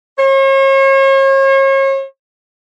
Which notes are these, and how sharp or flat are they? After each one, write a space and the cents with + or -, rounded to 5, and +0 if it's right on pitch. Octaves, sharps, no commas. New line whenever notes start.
C#5 -40